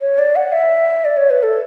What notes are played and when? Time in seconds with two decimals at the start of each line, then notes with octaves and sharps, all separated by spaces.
0.01 C#5
0.18 D5
0.36 F#5
0.52 E5
1.05 D5
1.17 C#5
1.30 B4
1.43 A4